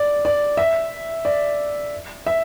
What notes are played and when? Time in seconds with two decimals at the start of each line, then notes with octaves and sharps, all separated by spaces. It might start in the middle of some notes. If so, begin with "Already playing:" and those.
Already playing: D5
0.25 D5
0.57 E5
1.25 D5
2.26 E5